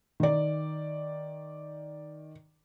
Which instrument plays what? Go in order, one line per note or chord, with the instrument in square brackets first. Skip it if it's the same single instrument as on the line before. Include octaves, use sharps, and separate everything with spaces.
[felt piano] D#3 D5